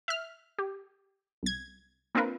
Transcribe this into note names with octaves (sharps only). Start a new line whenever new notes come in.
E5 F6
G4
C2 G#6
A#3 C4 D4 F4 A#4 B4